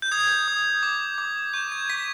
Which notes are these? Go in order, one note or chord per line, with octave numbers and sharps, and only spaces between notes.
G6
D#6 G#6
D#6
D6
D6
C#6 G6
G#6
C#6 B6